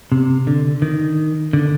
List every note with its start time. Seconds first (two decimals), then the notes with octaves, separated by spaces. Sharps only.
0.12 C3
0.47 D3
0.82 D#3
1.53 D3